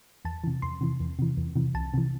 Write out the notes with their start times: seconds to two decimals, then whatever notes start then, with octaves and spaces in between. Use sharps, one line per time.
0.25 E2 A5
0.44 C3 E3
0.62 E2 C6
0.81 C3 E3
1.00 E2
1.19 C3 E3
1.37 E2
1.56 C3 E3
1.74 C2 A5
1.94 C3 E3